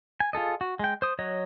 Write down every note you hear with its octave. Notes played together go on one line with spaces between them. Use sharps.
G#5
F4 G#4 A4 D#5
F#4
G#3 G5
C5 D#6
F#3 C#5 D#5